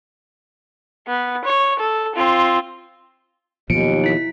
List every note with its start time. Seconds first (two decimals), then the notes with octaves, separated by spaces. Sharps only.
1.08 B3
1.44 C#5
1.79 A4
2.16 C4 F4
3.70 D#2 B2 F3 F#3 C#7 D7
4.04 E4 B6